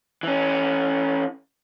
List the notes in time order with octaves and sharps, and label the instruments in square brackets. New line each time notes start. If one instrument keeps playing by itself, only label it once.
[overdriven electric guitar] E3 C#4